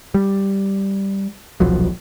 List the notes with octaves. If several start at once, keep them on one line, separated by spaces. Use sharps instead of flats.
G3
D#1 B1 F3 F#3